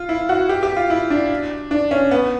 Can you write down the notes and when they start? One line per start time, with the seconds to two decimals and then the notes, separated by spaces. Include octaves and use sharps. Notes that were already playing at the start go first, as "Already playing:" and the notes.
Already playing: F4
0.09 E4
0.29 F#4
0.49 G4
0.63 G4
0.76 F4
0.90 E4
1.10 D4
1.71 D4
1.91 C#4
2.11 B3